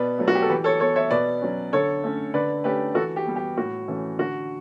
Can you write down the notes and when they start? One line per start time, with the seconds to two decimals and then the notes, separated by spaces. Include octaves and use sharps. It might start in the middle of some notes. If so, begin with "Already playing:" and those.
Already playing: B2 B4 D5
0.18 F#3 A3
0.28 F#4
0.35 G4
0.42 A4
0.50 E3 G4 B4
0.64 A4 C#5
0.80 B3 A4 C#5
0.96 C#5 E5
1.11 B2 B4 D5
1.42 F#3 C#4
1.73 D3 A4 C#5
2.03 A3 C#4
2.34 D3 B4 D5
2.64 A3 C#4 G4 B4
2.95 E3 F#4 A4
3.16 G4
3.26 G3 B3
3.36 G4
3.57 A2 F#4
3.88 E3 A3 C#4
4.18 D3 F#4